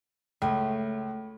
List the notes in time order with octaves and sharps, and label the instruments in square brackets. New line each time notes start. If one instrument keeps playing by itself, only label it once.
[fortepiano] C#2 [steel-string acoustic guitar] A3